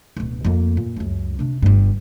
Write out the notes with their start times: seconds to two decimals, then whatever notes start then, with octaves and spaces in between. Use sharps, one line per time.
0.17 D1 B2
0.45 F2 A#3
0.77 A#2
0.97 C#2 F#2
1.39 C3 D4
1.62 G1 G2